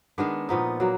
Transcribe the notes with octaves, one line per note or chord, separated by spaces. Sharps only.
D#3 G#3 B3 D4
A#2 F3 B3 D#4
F#3 A#3